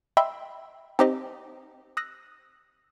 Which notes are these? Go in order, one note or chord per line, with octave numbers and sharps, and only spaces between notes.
D#5 E5 G5 B5 C6 E6
C4 D#4 G4 C5 D#5
D#6 E6 F#6 A#6